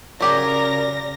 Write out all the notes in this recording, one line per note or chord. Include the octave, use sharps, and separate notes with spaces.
C#3 F#3 G4 G#4 A#4 D5 A#6